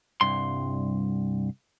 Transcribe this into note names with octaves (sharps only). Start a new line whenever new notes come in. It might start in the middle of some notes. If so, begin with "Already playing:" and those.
C2 G2 C6